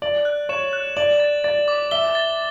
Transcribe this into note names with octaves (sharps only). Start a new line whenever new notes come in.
D5 F#7
F#6
C#5 E7
F#6
D5 F#7
A6
D5 A6
D6
E5 G7
A6